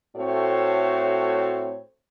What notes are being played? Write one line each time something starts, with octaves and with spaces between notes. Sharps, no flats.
A2 A3 C4 F#4 A4 C#5